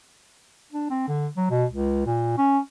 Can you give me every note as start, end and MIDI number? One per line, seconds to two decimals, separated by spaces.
0.72 0.87 62
0.90 1.06 60
1.08 1.28 50
1.37 1.46 54
1.50 1.65 47
1.71 2.04 37
2.06 2.35 46
2.38 2.59 61